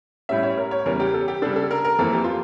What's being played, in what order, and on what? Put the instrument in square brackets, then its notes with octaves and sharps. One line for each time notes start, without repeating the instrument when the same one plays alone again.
[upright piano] A2 G3 C#4 E5
C#5
A#4
C#5
E2 C#3 G3 A#4
G4
A4
G4
C#3 G3 D4 A4
A4
A#4
A#4
F2 E3 A#3 A4
G4
F4